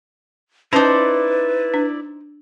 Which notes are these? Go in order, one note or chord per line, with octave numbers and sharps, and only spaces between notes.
C#4 D#4 E4 B4 C5 D5 A5
D4